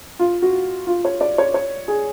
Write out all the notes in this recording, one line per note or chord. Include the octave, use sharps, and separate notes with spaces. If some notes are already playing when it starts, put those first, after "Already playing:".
F4
F#4
F4
C#5
D5
C#5
C#5
G#4